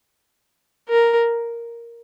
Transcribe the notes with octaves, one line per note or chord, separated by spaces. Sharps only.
A#4